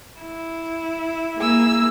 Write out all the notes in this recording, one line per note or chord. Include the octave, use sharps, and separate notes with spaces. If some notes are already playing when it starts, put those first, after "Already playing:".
E4
A#3 G#4 E6